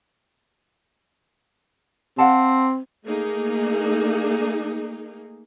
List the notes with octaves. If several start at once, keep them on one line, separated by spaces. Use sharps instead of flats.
C4 F5 F#5 A5
A3 A#3 D#4 G#4